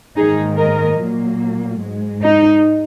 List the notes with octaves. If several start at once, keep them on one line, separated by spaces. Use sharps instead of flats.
G#2 D#3 A#3 D#4 G#4
A#4 D#5
A#2 F#3 A#3
G#2 G#3
D#4